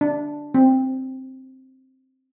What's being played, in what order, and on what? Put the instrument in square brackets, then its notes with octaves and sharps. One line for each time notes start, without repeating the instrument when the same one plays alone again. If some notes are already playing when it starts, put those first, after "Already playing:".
[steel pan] D4
C4